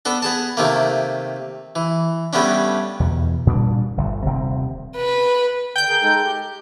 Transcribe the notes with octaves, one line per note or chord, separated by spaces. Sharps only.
B3 D4 A4
B3 G#4 A5
C3 D#3 A3 A#3
E3
G2 G3 A3 B3 C#4 D4
E2 B2
A#2 G3 D4
G1 D2
D#1 C3 C4
B4
D3 G5 G6
G#4 A#4
G#3 D#4 A4
G4